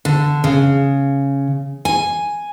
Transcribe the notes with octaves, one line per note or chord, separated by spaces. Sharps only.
D3
C#3
G#5